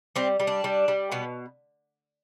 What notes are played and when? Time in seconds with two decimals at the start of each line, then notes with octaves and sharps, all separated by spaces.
0.15 G3 C4
0.40 G3
0.47 D4
0.64 G3
0.88 G3
1.12 B2 B3